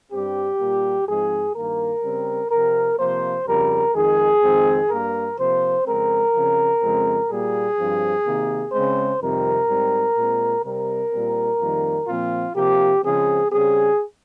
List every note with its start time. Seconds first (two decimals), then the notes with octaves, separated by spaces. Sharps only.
0.12 G2 G3 C4 G4
0.59 A#2 G3 A#3
1.07 G#2 F3 G#3 C4 G#4
1.55 G2 D#3 A#3 A#4
2.03 C#3 G3 C4
2.50 C3 F3 C4 A#4
2.98 C3 F3 A#3 C5
3.46 F2 C#3 G3 A#4
3.93 F2 D#3 G#3 G#4
4.42 F2 D#3 G#3 C4
4.89 G2 G3 A#3 A#4
5.38 C3 F3 A#3 C5
5.85 F2 C#3 G#3 C4 A#4
6.33 C#3 F3 C4
6.80 F2 C#3 G#3 C4
7.28 A#2 G3 A#3 G#4
7.77 G2 F3 C4
8.25 C3 D#3 A#3
8.72 C#3 G#3 C4 C5
9.19 F2 C3 D#3 G3 A#4
9.67 G#2 G3 C4
10.15 A#2 G#3 C4
10.63 C3 G3 C4 A#4
11.11 A#2 G3 C4
11.60 F2 D#3 G3 A#3
12.07 A#2 F3 C4 F4
12.54 C3 F3 A#3 G4
13.02 C#3 F3 G#3 C4 G#4
13.50 C#3 G3 C4 G#4